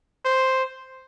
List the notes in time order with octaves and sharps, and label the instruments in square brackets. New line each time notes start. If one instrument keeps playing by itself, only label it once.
[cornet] C5